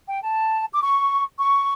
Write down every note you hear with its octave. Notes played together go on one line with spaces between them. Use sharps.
G5
A5
D6
C#6
C#6